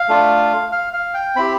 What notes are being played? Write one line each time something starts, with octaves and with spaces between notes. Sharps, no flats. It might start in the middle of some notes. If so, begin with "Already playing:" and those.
Already playing: F5
A3 D4 F4
F5
F5
G5
C4 E4 G4 B5